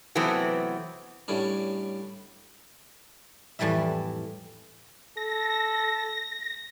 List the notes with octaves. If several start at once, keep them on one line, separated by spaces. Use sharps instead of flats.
C3 E3 F#3 A3 B3 C4
A2 G3 C#4 D4
F2 A2 E3 G3 E4 E5
A4 A#6